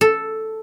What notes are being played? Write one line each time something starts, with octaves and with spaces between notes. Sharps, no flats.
A4